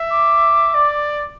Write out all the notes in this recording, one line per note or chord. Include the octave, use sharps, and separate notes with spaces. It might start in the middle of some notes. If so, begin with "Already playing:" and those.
Already playing: E5
D6
D5